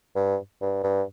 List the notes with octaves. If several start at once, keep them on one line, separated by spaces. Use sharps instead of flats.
G2
G2
G2